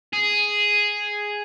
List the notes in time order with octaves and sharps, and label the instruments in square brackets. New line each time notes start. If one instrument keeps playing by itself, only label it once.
[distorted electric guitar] G#4